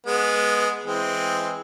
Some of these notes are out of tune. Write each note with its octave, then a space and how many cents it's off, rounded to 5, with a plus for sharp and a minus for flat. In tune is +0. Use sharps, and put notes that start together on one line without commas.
G#3 +0 B3 -10
E3 +10 G#3 +0 C4 +0